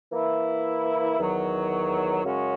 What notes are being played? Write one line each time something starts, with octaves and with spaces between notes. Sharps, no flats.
E3 A#3 E4
E2 D#3 F#3
F#2 C#3 G#3 C#4 F#4